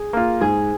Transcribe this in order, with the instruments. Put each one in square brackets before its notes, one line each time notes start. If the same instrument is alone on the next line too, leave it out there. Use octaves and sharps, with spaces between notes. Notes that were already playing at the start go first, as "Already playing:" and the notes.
Already playing: [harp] G#4
[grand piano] A#3 F4
[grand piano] G#2 [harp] G#4